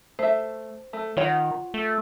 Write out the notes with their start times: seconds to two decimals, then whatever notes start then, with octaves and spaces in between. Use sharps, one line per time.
0.19 A3 C5 E5
0.93 A3
1.17 D#3 F4 C#5 F#5
1.74 A3